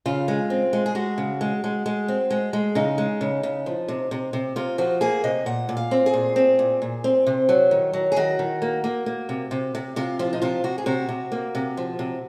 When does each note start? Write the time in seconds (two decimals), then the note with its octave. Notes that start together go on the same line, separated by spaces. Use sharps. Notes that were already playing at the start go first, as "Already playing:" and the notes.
0.06 C#3 F4
0.28 G#3
0.50 C4
0.73 G#3
0.86 G#4
0.95 G#3 F#4
1.18 C#3
1.41 G#3
1.64 G#3
1.86 G#3
2.08 C4
2.31 G#3
2.53 G#3
2.75 C#3 D#4
2.98 G#3
3.21 C#3
3.43 C#3
3.66 F3
3.88 C3
4.11 C3
4.33 C3
4.56 C3 F4
4.78 F3 F#4
5.01 A#3 G#4
5.24 C3 D#5
5.46 A#2 F#5
5.69 A#2
5.77 F5
5.91 C4
6.06 G#4
6.14 A#2
6.36 C4
6.59 A#2
6.82 A#2
7.04 C4
7.27 C3
7.49 F#3
7.71 D#3
7.93 F#3
8.12 G#4
8.16 D#3 F#4
8.39 D#3
8.62 A#3
8.84 A#3
9.06 A#3
9.29 C3
9.51 C3
9.75 C3
9.96 C3 F4
10.19 F3 F4
10.33 D#4
10.42 C3 F4
10.64 C3 F#4
10.78 G#4
10.86 C3 F#4
11.09 C3
11.32 A#3
11.55 C3
11.77 F3
11.99 C3